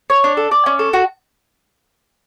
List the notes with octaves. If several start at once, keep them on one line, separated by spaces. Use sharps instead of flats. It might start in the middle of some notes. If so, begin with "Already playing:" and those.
C#5
D4
A4
D5
C#4
A4
F#4